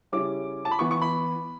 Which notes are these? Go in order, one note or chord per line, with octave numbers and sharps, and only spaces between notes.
C#3 G3 C#4 E4 D6
A5
B5
E3 B3 E4 C#6
C#6
B5